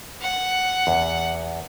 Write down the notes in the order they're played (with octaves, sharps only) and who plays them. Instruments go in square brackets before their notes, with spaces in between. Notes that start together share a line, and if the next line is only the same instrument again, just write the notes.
[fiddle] F#5
[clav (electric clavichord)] E2